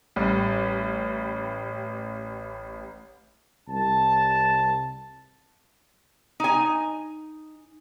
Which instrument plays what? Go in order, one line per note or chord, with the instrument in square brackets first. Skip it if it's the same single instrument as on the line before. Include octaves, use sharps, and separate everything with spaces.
[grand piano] A1 G3
[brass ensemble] C2 A5
[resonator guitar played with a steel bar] D#4 G#5